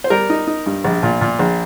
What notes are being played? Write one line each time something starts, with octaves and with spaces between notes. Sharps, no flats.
C5
G3 A#4
D#4
D#4
G2
A#1
A#2
A#2
A#1